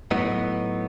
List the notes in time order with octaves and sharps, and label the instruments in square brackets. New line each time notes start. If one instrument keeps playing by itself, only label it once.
[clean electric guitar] A2 F#3 B3 D#4